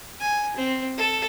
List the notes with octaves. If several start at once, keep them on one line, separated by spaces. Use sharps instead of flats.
G#5
C4
A4